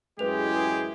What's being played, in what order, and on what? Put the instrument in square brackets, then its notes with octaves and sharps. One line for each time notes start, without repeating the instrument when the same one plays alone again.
[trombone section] A1 F#2 G#3 [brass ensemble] E4 G#4 [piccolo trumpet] G4 [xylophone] B4 F7